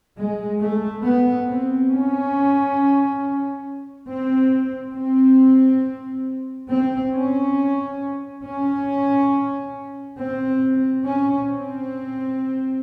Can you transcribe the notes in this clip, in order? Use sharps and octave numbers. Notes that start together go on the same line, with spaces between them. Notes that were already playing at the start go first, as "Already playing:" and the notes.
G#3
A3
B3
C4
C#4
C4
C4
C4
C#4
C#4
C4
C#4
C4